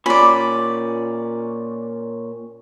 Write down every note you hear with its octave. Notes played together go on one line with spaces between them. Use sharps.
A#2 C#4 D5 B5